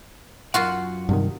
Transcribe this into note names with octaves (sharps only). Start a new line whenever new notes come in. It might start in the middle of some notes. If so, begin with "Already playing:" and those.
F#2 F4 F#4 F#5
G2 C3 D#3